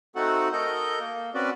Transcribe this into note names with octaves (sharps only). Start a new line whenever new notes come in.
A3 C4 D#4 F#4 A4 F#5
A4 A#4 D#5 G6
A#3
C4 C#4 F#4 B4 D5